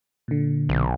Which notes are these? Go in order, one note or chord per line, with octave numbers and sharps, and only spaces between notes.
A#2 D3
B1